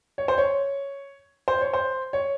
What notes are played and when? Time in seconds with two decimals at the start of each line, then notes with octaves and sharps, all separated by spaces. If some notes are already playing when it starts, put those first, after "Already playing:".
0.18 C#5
0.28 C5
0.38 C#5
1.48 C5
1.61 C#5
1.73 C5
2.13 C#5